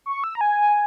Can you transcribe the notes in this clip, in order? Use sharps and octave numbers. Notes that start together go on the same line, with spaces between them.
C#6
E6
A#5
G#5